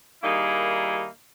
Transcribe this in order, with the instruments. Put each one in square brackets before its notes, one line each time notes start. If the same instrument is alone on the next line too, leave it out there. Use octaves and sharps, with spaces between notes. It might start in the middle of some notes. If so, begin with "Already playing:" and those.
[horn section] D#3 G3 A#3 D#4 E4 G#4